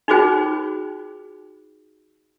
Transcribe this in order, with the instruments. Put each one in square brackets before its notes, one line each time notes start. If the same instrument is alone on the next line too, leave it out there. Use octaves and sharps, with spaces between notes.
[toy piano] D#4 F4 F#4 G#4 C5 G5